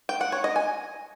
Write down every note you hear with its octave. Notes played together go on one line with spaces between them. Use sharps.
G5
F#5
C#5
D#5
G#5